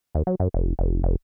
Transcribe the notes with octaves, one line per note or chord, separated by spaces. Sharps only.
D#2
F#3
F#2
F1
F1
F1